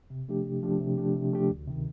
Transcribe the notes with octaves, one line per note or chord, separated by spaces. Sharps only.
C3
F3 A3 D4 G4
C3
F3 A3 D4 G4
C3
F3 A3 D4 G4
C3
F3 A3 D4 G4
D2
C3 D#3